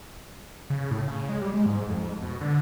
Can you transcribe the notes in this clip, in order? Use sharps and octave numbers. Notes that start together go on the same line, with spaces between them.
C#3
A2
C#3
G#3
G3
G#3
G#2
F2
B2
D3